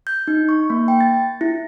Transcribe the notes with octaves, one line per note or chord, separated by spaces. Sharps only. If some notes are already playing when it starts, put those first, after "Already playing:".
G6
D#4
C#6
A#3
G5
A6
E4